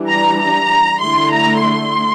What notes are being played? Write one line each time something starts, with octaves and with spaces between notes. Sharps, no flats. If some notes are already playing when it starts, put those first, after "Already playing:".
Already playing: E3 G3 D4
A#5
A#5
D3 A3 E4 C6
A#5
C6